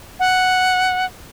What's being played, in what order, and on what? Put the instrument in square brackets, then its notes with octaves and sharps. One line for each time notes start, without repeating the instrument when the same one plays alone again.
[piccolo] F#5